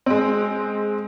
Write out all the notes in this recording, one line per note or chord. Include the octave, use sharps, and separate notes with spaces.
G#3 C4